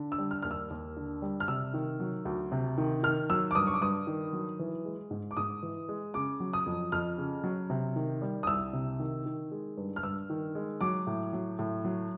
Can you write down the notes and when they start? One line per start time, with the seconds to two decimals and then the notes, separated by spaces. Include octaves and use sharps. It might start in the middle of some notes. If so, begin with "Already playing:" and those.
Already playing: D3
0.12 E6
0.18 G3
0.31 F6
0.42 D#2 F6
0.51 E6
0.70 D#2
0.97 D3
1.22 G3
1.40 F6
1.48 C3 E6
1.74 D#3
2.00 F#3
2.25 D2
2.52 C3
2.78 D#3
3.03 D#3 F6
3.30 F#3 E6
3.51 D6
3.55 G2 D#6
3.67 C#6
3.74 D6
3.81 G2 D#6
4.07 D#3
4.33 F#3
4.59 E3
4.85 G#3
5.11 G#2
5.31 D6
5.37 G#2 D#6
5.63 E3
5.89 G#3
6.14 C#3 D6
6.40 F#3
6.53 D#6
6.66 F2
6.92 F2 F6
7.18 C#3
7.44 F#3
7.70 C3
7.96 D#3
8.22 G3
8.43 D#6
8.47 C2 E6
8.73 C3
9.00 D#3
9.26 D#3
9.51 G#3
9.77 G2
9.96 F6
10.03 G2 E6
10.30 D#3
10.55 G#3
10.81 F#3 D6
11.07 A2
11.33 F#3
11.59 A2
11.85 F#3